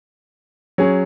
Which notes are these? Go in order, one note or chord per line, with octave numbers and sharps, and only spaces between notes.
F#3 C#4 G#4